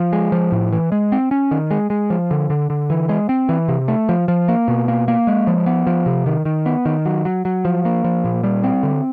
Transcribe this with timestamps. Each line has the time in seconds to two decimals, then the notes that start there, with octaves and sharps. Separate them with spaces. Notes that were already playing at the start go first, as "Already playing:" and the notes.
Already playing: F3
0.13 G#3
0.32 F3
0.52 A2
0.72 E3
0.92 G#3
1.12 C4
1.31 C#4
1.51 D#3
1.71 G#3
1.90 G#3
2.10 F3
2.31 D3
2.50 D3
2.70 D3
2.90 E3
3.09 G#3
3.29 C4
3.49 E3
3.68 C3
3.88 A3
4.09 F3
4.28 F3
4.48 A#3
4.68 B2
4.88 A#3
5.08 A#3
5.27 G#3
5.47 F3
5.66 B3
5.87 F3
6.06 C3
6.26 D#3
6.45 D#3
6.66 B3
6.85 D#3
7.05 F#3
7.25 F#3
7.45 F#3
7.65 F3
7.85 A#3
8.04 F3
8.24 A#2
8.44 G3
8.64 C4
8.83 D3